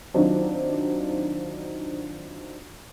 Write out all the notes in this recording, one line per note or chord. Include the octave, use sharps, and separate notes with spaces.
D#3 F#3 C4 D4 D#4 F4